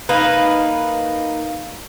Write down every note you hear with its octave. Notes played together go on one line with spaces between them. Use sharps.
A#3 D#4 B4